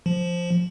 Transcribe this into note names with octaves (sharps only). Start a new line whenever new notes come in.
F3